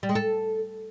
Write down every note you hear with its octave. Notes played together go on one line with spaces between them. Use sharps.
G3
G#3
A4